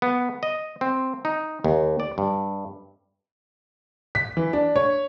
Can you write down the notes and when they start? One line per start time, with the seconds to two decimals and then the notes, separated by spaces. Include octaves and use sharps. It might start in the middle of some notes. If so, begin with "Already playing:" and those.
0.02 B3
0.43 D#5
0.81 C4
1.25 D#4
1.64 D#2
2.00 D5
2.18 G2
4.15 B6
4.37 E3
4.53 D4
4.76 C#5